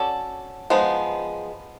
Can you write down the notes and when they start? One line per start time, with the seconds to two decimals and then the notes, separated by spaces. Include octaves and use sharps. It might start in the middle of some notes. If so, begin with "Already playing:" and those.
Already playing: C#4 F#4 A4 D5
0.70 F3 G#3 B3 D#4